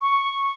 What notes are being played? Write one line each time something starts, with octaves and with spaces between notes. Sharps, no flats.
C#6